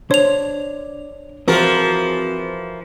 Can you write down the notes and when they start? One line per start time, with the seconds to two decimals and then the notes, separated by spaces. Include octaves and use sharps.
0.11 D4 C5 C#5 F7
1.48 E3 F3 C4 F#4 G#4 A#4